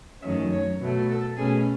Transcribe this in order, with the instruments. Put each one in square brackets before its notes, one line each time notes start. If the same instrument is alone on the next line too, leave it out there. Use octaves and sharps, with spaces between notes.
[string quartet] F#2 D#3 F#3 A3 C#4 E5
C#5
B2 F#3 A3
A4
B2 A3 C#4 G#4